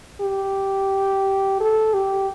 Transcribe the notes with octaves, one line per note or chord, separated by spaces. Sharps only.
G4
A4
G4